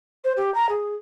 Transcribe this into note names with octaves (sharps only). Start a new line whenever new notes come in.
C5
G4
A#5
G#4